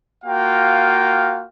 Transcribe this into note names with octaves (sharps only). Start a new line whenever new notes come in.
A#3 F4 F#4 F5 G5